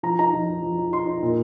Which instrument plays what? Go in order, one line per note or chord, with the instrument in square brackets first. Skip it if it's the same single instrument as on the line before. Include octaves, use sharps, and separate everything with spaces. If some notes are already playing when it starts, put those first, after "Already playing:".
[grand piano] F3 A#5
D#4 A#5
F3
D#4
F3
D#4
D#4 C6
D#4
A#2